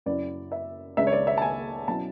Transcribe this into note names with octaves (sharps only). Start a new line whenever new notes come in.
F#2 C#3 F#3 C#4 E4 D5
E5
C#2 C#3 G#3 D4 E5
C#5
D5
E5
A5
G#5
B2 F#3 C#4 E4 A5